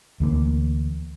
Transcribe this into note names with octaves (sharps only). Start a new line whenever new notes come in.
D2 E3 G#3 A#3